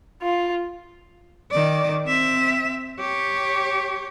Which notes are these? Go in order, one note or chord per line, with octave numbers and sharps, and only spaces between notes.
F4
D#3 D5
C4 E5
G4 C#5